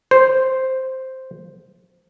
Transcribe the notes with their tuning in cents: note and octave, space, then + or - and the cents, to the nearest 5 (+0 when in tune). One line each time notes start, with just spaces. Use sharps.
C5 +0